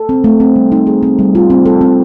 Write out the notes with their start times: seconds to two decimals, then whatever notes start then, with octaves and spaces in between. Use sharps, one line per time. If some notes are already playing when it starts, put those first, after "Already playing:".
Already playing: A4
0.09 C4
0.24 A3
0.40 C4
0.56 G3
0.72 D#4
0.87 G#4
1.03 C4
1.19 G3
1.35 F4
1.50 C4
1.66 A4
1.81 C4